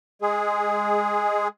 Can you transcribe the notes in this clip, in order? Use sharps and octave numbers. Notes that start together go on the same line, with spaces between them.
G#3 G#4